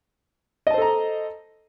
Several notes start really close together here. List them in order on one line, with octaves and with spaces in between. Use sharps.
D#5 A5 C5 A4 A#5